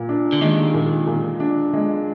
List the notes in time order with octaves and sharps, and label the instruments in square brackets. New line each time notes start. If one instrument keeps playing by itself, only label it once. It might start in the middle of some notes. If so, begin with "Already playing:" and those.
Already playing: [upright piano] A#2
D4
[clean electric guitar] D3
[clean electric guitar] D#2 D#3 [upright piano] G#3
[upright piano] A#2
A#2
D4
G#3